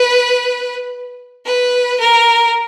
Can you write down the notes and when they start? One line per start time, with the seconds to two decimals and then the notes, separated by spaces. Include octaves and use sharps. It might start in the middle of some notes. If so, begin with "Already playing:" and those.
Already playing: B4
1.45 B4
1.99 A#4